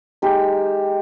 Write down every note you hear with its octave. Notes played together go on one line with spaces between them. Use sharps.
G#3 D#4 G4